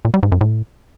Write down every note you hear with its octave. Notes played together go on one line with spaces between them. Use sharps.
A#2
G3
G#2
F#2
A2